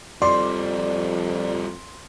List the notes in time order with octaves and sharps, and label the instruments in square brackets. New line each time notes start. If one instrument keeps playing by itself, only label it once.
[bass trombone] F2 [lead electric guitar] F3 G3 [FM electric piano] D5 [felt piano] C6